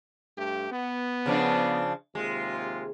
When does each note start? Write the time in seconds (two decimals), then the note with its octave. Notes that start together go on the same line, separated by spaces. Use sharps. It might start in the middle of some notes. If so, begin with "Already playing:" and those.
0.37 G2 A3 G4
0.72 B3
1.26 C#3 F3 D4
2.15 D#2 C3 G#3 F4